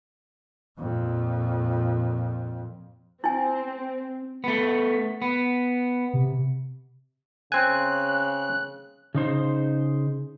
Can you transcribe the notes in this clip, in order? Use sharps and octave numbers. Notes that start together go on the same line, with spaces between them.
F2 A#2
C4 E4 G#5
A3 B3
B3
C3
C#3 C4 G#5 F#6
C#3 D#4 C5